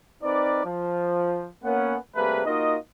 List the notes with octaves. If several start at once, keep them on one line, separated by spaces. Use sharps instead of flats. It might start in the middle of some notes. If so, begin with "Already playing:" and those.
C4 D#4 A#4 B4 D5
F3
A#3 B3 C#4 F#5
C3 G3 A3 A#3 G#4 B4
A#3 D#4 F4 F#4 A#4 D#5